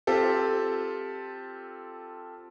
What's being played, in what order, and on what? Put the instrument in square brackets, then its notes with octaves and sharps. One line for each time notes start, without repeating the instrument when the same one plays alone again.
[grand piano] C4 F4 G4 A4